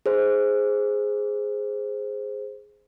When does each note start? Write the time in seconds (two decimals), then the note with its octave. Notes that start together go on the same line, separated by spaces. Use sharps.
0.06 G#4 C5